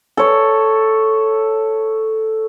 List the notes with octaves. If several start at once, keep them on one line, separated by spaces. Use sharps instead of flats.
A4 C#5